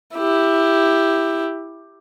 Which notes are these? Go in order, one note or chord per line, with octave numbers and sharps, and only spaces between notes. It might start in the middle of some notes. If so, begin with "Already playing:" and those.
E4 G4